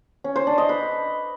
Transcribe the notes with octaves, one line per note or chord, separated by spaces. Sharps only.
C#4
C5
D4
D#5
B4